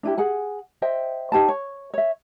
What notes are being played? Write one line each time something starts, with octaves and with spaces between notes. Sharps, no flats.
D4 E4 G4
G#4 F#5 G#5
C5 D#5 E5 G5
D#4 G4 C5 A5
C#5
C#5 E5